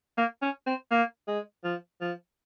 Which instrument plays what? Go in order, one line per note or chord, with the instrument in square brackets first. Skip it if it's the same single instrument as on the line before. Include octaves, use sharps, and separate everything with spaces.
[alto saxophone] A#3
C#4
C4
A#3
G#3
F3
F3